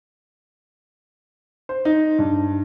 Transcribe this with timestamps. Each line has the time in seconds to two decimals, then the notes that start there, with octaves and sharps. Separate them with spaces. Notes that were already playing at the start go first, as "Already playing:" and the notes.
1.69 C5
1.85 D#4
2.19 G2